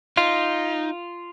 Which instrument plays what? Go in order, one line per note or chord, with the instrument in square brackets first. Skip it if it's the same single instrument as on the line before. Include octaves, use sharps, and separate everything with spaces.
[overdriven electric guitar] D#4 [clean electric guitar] F4